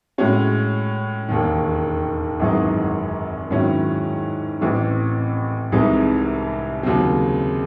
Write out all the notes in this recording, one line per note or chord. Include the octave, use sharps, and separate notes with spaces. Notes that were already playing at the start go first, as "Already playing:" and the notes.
A2 G#3 C#4 F#4
E1 D#2 D#3
G#1 F#2 E3 G#3 D#4
G#2 D#3 F#3 C#4 E4
A1 A2 E3 C4
C2 C3 E3 G#3 D#4
D#2 C#3 F#3 C4